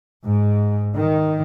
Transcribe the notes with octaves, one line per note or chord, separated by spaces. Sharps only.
G#2
D#3